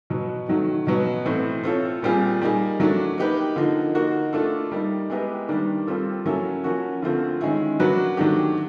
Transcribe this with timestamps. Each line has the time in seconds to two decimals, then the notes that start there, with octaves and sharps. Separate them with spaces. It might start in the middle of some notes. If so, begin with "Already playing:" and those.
0.10 B2 F#3 B3
0.48 D#3 F#3 A3
0.87 B2 F#3 B3
1.25 A2 E3 A3 C4
1.63 C4 F4 A4 C#5
2.02 A#2 G3 C4 F4 G#4
2.41 G3 A#3 D#4 G#4
2.80 F#3 A3 D4
3.18 A#3 D#4 G4 B4
3.56 D3 F3 A#3 D#4
3.95 A#3 D#4 F#4
4.33 A3 D4 F4 A4
4.72 G3 A#3 D#4
5.10 G#3 B3 E4 G4 A#4
5.48 D#3 G3 A#3 D4
5.87 G3 C4 F4 A4
6.25 F#3 A#3 C#4 E4 A4
6.64 F3 A#3 C#4 F#4
7.02 D3 F3 A3 C4 F4
7.41 D#3 G#3 C#4 E4
7.79 F#3 A#3 D4 F#4 B4
8.17 D#3 F#3 A3 D4 G4